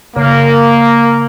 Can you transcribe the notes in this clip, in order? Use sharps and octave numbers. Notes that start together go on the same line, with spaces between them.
C#3 A#3